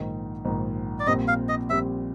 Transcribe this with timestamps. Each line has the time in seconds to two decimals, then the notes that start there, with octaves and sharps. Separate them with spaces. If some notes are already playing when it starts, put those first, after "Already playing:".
Already playing: A#1 G#2 D#3
0.45 A#1 G#2 D#3
1.00 D5
1.07 A#1 A#2 G3 C4 D#5
1.28 F5
1.49 D#5
1.70 A#1 A#2 G3 C4 E5